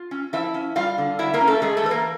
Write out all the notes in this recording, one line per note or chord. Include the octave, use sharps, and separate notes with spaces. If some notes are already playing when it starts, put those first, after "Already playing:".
Already playing: F4
C#4
F3 E4 E5
C#4
G3 F4 F5
D3
F#3 E4 E5
A#3 A#4
C#4
A3 A4
G#3 A3 G#4
A3 A4
E3 B4
A#3 A#4